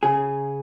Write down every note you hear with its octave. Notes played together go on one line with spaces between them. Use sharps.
C#3 G#4